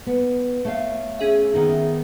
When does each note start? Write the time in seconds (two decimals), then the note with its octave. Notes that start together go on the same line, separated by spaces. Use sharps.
0.06 B3
0.65 A3 C#5 F5
1.19 C#4 G#4 E5
1.54 D#3 B3 D#4